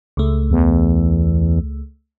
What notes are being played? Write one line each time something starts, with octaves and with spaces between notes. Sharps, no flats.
C#2 A3
E2